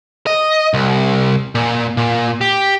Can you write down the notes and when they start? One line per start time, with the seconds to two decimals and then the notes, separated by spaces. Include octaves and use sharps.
0.27 D#5
0.74 C2
1.55 A#2
1.97 A#2
2.41 G4